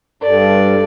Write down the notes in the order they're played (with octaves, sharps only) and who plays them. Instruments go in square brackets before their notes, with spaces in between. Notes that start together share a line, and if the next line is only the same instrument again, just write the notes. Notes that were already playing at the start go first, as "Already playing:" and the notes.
[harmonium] G2 [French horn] A4 [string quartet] D5